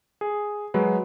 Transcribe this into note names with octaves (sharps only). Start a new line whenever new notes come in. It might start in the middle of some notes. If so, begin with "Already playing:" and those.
G#4
F#3 G#3 B4